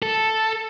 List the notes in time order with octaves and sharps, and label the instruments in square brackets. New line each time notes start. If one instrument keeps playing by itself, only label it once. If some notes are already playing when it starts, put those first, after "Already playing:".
[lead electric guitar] A4